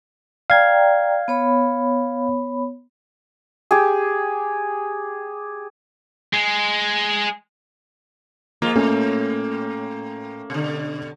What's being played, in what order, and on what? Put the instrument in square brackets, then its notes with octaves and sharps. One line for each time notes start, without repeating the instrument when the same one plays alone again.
[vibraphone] D5 G5 A#5 [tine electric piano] F5 G#6
[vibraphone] B3 C#5 B5
[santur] G4 G#4
[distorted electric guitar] G#3
[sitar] F3 G#3 F4 [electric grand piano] A#3
[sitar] A2 [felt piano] A3 C#4 C#5
[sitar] B2 D3